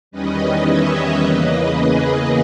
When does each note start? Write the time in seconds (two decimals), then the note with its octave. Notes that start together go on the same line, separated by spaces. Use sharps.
0.11 E2 D#3 G3 C#4 B4 D#5
0.65 C#5 E5
1.19 E2 C#3 E3 A#3 B4 D#5
1.73 G#4 B4